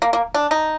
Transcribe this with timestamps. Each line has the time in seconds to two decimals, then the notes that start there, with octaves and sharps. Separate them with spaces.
0.02 A#3
0.13 A#3
0.34 D4
0.51 D#4